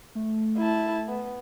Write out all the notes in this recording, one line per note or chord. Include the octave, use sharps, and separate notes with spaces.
A3
E4 A5
B3